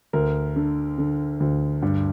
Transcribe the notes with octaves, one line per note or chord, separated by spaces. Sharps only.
D2 A#4
D3
D3
D2
G2